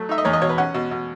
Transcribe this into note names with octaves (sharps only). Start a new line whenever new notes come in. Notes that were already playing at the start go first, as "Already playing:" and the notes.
Already playing: F#3 A3
D#4 E5
D#5
E2 C#5
D#5
B2 C#5
B4
C#4 F#5
B2
B2